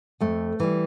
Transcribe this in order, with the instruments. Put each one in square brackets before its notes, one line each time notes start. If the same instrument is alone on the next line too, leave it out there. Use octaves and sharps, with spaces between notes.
[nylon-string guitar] F2 A3
E3 G3